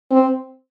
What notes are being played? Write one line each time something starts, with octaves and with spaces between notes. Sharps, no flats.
C4